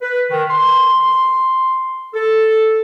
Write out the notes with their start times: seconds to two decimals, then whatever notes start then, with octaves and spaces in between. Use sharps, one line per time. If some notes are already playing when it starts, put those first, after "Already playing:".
0.01 B4
0.30 D#3
0.49 C6
2.14 A4